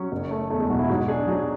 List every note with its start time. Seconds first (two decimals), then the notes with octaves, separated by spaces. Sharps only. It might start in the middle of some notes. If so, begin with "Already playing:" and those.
Already playing: F#3 C#4 C#5
0.12 F#1
0.31 A3
0.50 E2 A3 A4
0.60 G#3 G#4
0.70 B2 F#3 F#4
0.79 E4
0.89 G#2 F#3 F#4
1.08 G#3 D4 G#4
1.28 F#3